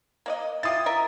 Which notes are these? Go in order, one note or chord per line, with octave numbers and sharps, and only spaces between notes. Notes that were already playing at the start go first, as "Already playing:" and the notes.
A#3 D5 D#5
E4 F4 G4 D#6 A6
A#4 D#5 E5